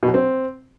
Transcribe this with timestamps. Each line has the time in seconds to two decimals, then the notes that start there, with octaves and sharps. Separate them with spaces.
0.03 B2
0.08 F#3
0.14 C4